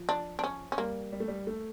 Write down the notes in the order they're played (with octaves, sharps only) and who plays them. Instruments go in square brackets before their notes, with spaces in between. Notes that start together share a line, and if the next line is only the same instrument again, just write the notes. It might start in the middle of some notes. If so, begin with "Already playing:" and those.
Already playing: [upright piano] F3
[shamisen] D4
D4
C#4
C#4
[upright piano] G3 [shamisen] A#3
[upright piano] G3
A3
G3
A3